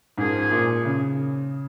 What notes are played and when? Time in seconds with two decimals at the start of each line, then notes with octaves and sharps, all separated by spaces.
0.18 G#2 F3 A#3 C#4 G#4
0.52 A#2
0.85 C#3